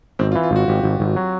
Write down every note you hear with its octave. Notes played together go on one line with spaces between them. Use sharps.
G#1 C4
F4
E3
F4
G#1 F#4
G#1 G4
G#1
G#1
F#3